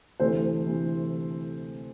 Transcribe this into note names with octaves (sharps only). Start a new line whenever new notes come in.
D2 C3 E3 A3 A4 C5
D2 C3 E3 A3